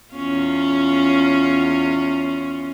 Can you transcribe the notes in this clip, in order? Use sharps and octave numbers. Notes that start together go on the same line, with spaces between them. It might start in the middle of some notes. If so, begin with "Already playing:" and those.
E2 C#4 F4